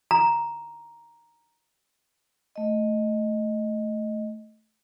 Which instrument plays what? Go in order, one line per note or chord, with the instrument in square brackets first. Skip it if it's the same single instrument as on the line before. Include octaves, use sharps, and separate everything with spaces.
[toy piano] A#5
[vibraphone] A3 D#5